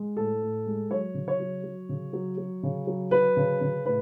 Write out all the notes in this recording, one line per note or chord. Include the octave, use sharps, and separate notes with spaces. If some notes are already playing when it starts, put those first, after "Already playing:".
Already playing: G#3
A2 A4
A2
G#3
F#3 C#5
C#3
C#5
F#3
F#3
C#3
F#3
F#3
C#3
F#3
F#3 B4
C#3
C#3
A2 B4